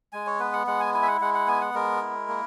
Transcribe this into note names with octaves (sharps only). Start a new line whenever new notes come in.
G#3 G#5
C#5
B3 B4
F#5
G#3 F#5
G#5
E4 G#5
E5
F#5
G#3 F#5
F#5
B3 G#5
F#5
G#3 A#4
E4
A#3